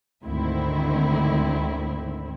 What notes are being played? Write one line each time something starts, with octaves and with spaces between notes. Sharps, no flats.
D2 G#2 D3 D#3 C4 E4